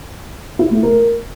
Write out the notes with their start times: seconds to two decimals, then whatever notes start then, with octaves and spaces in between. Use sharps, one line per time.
0.59 E4
0.71 A3
0.83 A#4